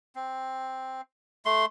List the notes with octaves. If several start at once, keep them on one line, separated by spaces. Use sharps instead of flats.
C4
A3 C6